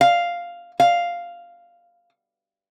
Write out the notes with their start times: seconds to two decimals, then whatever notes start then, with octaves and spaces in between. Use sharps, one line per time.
0.01 F5
0.80 F5